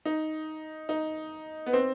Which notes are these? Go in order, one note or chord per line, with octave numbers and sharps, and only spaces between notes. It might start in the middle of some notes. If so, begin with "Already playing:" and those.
D#4
D#4
B3
C4